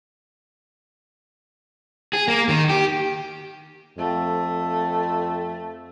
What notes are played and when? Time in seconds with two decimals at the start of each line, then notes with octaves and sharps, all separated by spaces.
2.13 G#4
2.28 A#3
2.49 D#3
2.70 G4
3.98 F2 A3